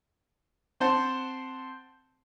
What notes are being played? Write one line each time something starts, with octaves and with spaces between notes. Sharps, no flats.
C4 C5 F#5 A5